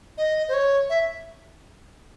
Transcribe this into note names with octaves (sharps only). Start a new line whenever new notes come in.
D#5
C5
C#5
E5